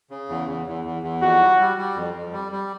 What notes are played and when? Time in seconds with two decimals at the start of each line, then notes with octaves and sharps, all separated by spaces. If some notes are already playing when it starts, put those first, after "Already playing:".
0.10 C#3
0.29 E2
0.47 E2
0.67 E2
0.85 E2
1.03 E2
1.22 F2 F#4
1.40 G3
1.59 G3
1.78 G3
1.96 F2
2.14 F2
2.33 G3
2.52 G3